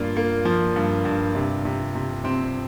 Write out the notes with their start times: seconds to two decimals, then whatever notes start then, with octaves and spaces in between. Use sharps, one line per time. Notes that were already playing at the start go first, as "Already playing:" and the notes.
Already playing: G2 A#3 D4 F4
0.17 A#3
0.45 F3
0.76 G2
1.05 G2
1.35 C3
1.65 C3
1.95 C3
2.24 C3 C4